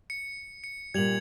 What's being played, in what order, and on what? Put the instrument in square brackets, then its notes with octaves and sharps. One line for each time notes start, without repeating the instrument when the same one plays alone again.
[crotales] C#7
C#7
[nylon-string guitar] A#2 G3 [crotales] G#6 F7 F#7